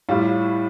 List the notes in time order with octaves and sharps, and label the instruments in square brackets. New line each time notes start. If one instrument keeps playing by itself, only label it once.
[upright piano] A2 G3 F4